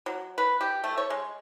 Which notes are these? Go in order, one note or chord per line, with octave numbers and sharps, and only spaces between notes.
F#3
B4
G4
A3
C#5
G#3